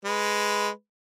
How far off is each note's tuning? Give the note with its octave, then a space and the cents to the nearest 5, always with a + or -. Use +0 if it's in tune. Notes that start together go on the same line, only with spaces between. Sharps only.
G#3 +0 B4 +0